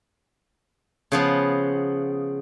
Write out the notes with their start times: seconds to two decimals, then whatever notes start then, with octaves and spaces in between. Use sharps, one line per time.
1.12 C#3 F3 B3